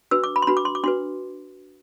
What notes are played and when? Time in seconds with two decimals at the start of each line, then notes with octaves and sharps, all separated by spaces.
0.11 D4 F#4 B4 E6
0.24 D6
0.36 B5
0.42 C6
0.47 D4 F#4 B4 B5
0.57 D6
0.65 C6
0.75 D6
0.84 D4 F#4 B4 C6